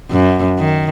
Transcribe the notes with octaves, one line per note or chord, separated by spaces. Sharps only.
F#2
D#3